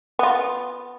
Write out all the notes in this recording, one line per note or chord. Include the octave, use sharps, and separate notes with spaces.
B3 F4